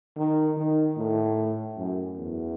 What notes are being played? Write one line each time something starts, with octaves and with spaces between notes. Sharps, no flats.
D#3
D#3
A2
F#2
E2